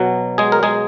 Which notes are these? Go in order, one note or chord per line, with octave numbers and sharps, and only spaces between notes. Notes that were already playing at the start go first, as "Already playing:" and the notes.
Already playing: B2 F#3
G#3 G#4
A#4
G#3 G#4